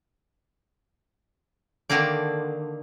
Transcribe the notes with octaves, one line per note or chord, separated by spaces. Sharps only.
D3 D#3 A#3 D5